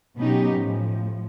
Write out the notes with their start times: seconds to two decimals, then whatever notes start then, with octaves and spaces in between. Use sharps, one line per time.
0.17 B2 F#3 B3 C#4 D#4 G4
0.56 A2 F3